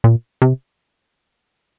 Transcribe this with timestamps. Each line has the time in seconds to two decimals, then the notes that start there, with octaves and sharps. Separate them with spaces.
0.04 A#2
0.42 C3